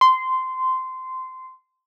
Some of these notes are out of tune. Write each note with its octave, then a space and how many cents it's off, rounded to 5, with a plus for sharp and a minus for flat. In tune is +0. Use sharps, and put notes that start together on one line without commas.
C6 -15